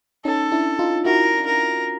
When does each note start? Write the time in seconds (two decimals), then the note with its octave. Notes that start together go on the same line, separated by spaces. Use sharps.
0.25 C#4 D#4 A4
0.52 D4 E4
0.79 D#4 F4
1.05 E4 F#4 A#4
1.46 A#4